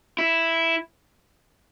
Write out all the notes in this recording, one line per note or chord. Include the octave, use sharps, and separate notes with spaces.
E4